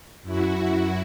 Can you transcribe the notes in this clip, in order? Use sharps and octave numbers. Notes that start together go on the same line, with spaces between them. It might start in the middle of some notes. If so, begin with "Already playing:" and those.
F#2 E4 F#4